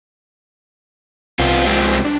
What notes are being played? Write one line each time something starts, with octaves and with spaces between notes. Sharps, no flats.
C2 B3 C4 F4
F3 G#3 C4
D4